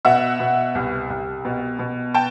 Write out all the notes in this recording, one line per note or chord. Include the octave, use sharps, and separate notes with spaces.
B2 E5 F#5
B2
C2
C2
B2
B2
G5 A5